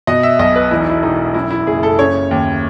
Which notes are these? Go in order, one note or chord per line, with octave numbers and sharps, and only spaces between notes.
B2 D#5
E5
B1 D#5
B4
E2 E4
D#4
E4
E1 D#4
F#2 E4
E4
F#1 G#4
A4
C#3 C#5
D#2